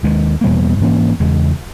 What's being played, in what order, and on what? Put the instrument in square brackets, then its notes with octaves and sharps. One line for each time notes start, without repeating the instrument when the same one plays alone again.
[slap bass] D#2 D#3 G#3
E2 B2 G3 A#3
G#2 E3 A#3 C#4
E2 C#3 G#3